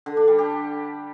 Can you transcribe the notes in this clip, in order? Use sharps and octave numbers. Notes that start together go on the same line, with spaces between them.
D3
D4
G3
G4